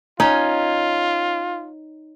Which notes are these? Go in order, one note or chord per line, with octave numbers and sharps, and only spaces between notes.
C#4 D#4 F4